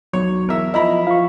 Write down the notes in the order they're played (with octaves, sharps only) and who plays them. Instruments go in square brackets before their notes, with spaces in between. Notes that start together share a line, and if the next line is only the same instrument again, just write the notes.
[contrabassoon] B1 [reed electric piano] F#3 [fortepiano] C#5
[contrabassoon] E2 [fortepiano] A#4 E5
[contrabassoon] F3 [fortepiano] E4 A#5 B5 [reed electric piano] D#5
[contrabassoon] F3 [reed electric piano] F5 C#6